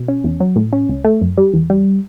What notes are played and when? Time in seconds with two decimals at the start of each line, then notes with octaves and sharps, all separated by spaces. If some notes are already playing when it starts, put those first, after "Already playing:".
Already playing: B2
0.08 C#4
0.24 E2
0.40 F#3
0.56 A2
0.73 C#4
0.89 C#2
1.04 A3
1.21 F#2
1.37 G3
1.54 E2
1.70 G3